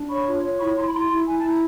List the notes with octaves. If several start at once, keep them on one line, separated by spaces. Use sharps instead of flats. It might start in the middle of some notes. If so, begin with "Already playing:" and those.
Already playing: D4
C#5 B5 C#6
F4
C#5
E4 B5 C#6
E4 A#5 C6
B5
E4 A#5 C6
E4
E4 G#5
E4 A5
A#5